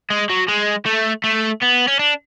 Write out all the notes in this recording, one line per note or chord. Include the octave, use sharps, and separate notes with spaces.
G#3
F#3
G#3
A3
A3
B3
C#4
D4